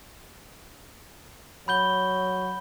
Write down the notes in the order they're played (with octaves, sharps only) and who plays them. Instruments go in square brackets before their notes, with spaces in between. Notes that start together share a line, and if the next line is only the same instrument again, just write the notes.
[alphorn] F#3 [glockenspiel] B5 G6 G7